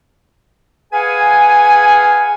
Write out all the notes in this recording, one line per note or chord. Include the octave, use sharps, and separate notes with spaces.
G#4 B4 F5 F#5 G#5